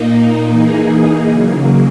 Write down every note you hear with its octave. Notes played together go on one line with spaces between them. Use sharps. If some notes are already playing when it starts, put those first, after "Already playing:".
Already playing: A#2 A#3 D#4
E3 A#3 D#4 G#4
C#3 F#3 A#3